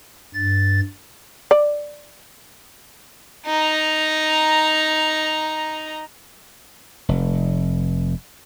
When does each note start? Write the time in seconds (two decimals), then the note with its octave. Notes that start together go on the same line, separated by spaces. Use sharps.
0.34 G2 A6
1.51 D5
3.46 D#4 A#5
7.09 F1